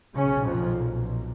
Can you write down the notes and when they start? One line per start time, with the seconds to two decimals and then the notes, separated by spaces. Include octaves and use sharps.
0.15 B1 A#2 C#3 C#4
0.45 F2 F3